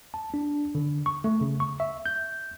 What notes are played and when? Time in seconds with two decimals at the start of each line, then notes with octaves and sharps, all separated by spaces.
0.14 A5
0.34 D4
0.75 D3
1.06 C#6
1.24 A3
1.41 C#3
1.60 C#6
1.80 E5
2.06 G6